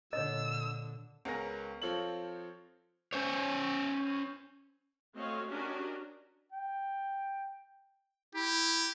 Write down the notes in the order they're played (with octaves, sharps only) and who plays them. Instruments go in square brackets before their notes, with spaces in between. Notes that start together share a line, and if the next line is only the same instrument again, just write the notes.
[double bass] A#2 D3 [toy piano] C#5 D#5 [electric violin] E6
[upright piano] C#2 B3 C#4 A#4 A#6
F3 C4 F4 A4 C#5 F#7
[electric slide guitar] C#4 C5 C#5
[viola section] A3 C4 F#4 C#5 D#5 F5
C#4 D4 F#4 G4 A#4 D#5
[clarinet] G5
[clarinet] E4 [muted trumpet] G4